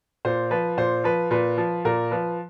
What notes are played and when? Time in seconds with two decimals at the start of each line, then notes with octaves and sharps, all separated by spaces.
0.25 A#2 C5
0.51 F3 B4
0.77 A#2 C5
1.04 F3 B4
1.31 A#2 B4
1.57 F3
1.85 A#2 A#4
2.11 F3 B4